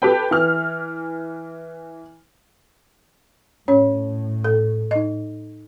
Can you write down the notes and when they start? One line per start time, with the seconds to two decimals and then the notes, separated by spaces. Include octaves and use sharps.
0.02 G4 A4 B4 G5
0.31 E3 F6
3.68 A2 C#4 C#5
4.44 A4
4.91 D#4 D#5